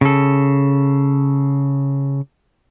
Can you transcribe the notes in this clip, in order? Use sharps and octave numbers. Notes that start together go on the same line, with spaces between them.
C#3 A4